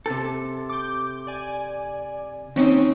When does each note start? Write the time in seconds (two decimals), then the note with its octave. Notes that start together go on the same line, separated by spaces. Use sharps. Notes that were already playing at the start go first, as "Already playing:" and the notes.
0.06 C3 A4
0.70 D6 G6
1.27 D5 G#5
2.56 D#2 C4 C#4 D#4